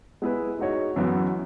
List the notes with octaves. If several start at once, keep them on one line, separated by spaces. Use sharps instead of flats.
G#3 B3 E4 G#4 B4
G#3 D#4 F#4 C#5
F#2 E3 B3 F#4